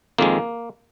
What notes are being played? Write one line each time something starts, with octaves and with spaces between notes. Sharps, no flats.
F2 D#3 G#3 A#3